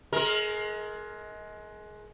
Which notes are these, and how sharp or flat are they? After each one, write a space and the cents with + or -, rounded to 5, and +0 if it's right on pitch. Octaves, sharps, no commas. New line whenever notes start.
G#3 +25 A#4 +0